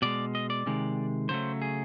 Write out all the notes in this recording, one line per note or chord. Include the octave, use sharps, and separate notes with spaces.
B2 G#3 D5
D#5
D5
C3 D#3 G#3
C#3 F#3 A3 C5
G#4